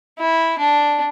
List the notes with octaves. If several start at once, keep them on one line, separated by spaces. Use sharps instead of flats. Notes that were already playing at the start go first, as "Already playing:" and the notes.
E4
D4